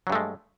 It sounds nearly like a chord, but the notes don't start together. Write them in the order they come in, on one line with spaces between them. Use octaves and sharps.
F#3 G2 A3 G#3